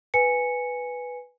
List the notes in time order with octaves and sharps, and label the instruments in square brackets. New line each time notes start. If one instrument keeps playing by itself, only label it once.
[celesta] B4 G#5 C#7